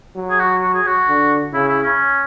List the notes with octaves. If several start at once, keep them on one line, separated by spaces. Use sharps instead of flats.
F#3
G#4
F#4
F#4
G#4
F#4
D3
C#3 E4
E4
C#4